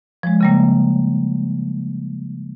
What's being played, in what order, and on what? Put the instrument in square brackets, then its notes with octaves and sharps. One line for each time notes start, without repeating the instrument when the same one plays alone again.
[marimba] F3 G#3
C#3 G3 A#3